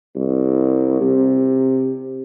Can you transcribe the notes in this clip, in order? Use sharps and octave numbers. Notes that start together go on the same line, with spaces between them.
C2
C3